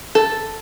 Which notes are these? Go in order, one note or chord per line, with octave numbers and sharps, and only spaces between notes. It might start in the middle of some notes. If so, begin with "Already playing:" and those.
A4